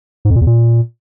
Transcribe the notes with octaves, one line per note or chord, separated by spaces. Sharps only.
G#2
F2
A#2
E2
A#2